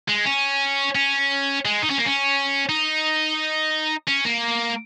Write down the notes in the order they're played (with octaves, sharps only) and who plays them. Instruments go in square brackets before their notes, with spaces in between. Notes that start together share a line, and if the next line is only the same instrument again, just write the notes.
[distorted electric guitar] G#3
C#4
C#4
G#3
D#4
C#4
A#3
C#4
D#4
C#4
A#3